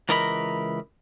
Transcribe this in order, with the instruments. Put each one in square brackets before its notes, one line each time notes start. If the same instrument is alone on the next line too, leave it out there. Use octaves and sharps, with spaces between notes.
[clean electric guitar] C#2 E3 A#4 D#5 A#5 B5